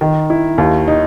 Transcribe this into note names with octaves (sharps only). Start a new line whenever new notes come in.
D#3
E4
D#2
D#4